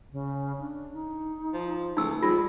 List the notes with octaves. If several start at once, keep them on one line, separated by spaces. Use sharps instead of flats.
C#3
D4
D#4
F3
C#2 A3 D#4 E6
G#2 G3 F4